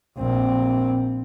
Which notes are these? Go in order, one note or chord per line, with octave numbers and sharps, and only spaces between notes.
A#1 C4